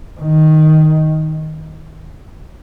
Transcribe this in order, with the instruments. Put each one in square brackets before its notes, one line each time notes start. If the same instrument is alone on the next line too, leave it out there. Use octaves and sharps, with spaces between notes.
[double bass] D#3